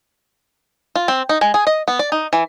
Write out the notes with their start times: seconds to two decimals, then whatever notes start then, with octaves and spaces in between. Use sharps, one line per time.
0.95 F4
1.08 C4
1.29 D#4
1.41 G#3
1.54 G#4
1.67 D#5
1.88 B3
1.99 D5
2.12 D#4
2.33 E3